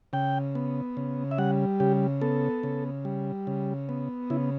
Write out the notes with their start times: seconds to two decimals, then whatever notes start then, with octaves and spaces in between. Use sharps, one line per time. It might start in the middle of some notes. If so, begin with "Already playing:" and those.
0.13 C#3 G5
0.55 B3
0.97 C#3
1.31 E5
1.38 G3 F#5
1.80 C#3 G4
2.21 B3 A4
2.63 C#3
3.05 G3
3.47 C#3
3.89 B3
4.30 C#3 E4